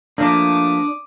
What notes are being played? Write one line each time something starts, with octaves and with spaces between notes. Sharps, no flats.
F3 A3 A#3 D4 D6 D#6